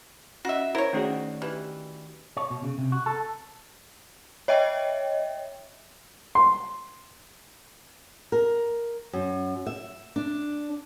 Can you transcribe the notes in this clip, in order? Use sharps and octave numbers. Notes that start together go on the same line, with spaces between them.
C#4 F#4 D#5 E5
E4 A#4 C5 C#5
D#3 A3 C#4 D4 F#4 G#4
E3 G4 B4
C#5
B2
C#3
C3
F#4
A4
C#5 D#5 E5 G5
C6
A#4
F#2
E5
D4